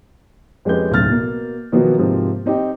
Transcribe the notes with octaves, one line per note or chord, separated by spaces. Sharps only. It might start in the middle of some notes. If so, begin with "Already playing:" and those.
F2 G#3 C#4 G4 B4 G6
D1 B1 C#3 A3 F6 A6
B2 A#3
B2 D#3 F3 F#3 A#3 B3
G#2 C3 F3 A#3 C4
C4 D#4 G4 G5